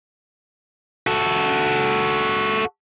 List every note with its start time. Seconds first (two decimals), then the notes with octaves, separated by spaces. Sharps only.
1.07 F#4 A4